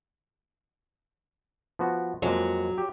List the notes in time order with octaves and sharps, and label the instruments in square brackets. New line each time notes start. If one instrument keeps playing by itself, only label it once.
[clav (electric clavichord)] F3 B3 F#4
[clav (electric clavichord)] F2 G#3 A#3 [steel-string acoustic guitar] F#3
[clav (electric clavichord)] G4